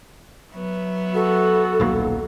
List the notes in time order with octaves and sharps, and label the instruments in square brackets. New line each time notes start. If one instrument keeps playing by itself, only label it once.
[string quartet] F#3 B3 E5
[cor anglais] F#4 [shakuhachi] A4
[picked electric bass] D#1 B1 A#3